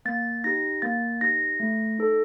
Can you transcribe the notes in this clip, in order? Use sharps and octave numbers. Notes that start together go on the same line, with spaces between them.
A#3 A6
D#4 G4 A#6
A#3 A6
D#4 G4 A#6
A3
D#4 A4